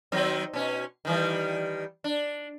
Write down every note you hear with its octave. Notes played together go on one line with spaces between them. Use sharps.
D#3 F#3 C4
B2 C#4
D#3 E3 G3
D4